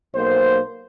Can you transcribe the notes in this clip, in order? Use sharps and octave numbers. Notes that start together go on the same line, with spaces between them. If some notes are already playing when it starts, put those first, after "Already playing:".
B1 A#3 C5